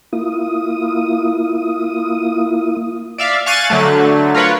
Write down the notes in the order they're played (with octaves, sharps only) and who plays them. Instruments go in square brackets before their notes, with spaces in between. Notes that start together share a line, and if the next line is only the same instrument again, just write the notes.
[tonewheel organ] A#3 E4 F4 D#6
[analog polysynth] D5 E5 F5
F5 G#5 C#6 F#6 A6 D#7
D3 F#3 A3
F4 A#4 B4 C#5 F#5